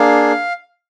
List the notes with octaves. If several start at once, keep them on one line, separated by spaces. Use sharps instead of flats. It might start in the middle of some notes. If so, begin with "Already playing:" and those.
Already playing: A#3 D4 G#4 F5